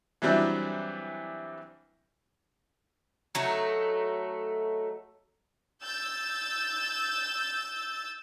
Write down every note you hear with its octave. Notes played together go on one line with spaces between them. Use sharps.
E3 F#3 G3 C4 D4 E4
F#3 A3 D#4
E6 G6 A6